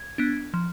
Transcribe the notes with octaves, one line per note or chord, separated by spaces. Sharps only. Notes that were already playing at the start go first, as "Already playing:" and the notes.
Already playing: G#6
B3 D4
F3